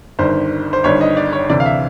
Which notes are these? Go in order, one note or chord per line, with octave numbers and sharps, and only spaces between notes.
G1 G2 D#3 C5
C5
G1 G2 D#3 C#5
D#5
D5
C#5
D2 C3 E3 D5
F5
E5